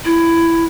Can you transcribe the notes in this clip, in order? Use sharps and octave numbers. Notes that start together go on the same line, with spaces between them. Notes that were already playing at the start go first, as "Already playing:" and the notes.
E4